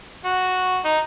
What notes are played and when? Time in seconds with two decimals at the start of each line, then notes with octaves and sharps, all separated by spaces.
0.25 F#4
0.85 D#4